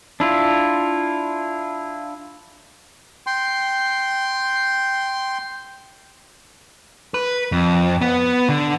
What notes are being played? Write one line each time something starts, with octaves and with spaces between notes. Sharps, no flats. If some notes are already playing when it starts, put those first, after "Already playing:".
D4 E4 F4
G5 C6
B4
F2
B3
D3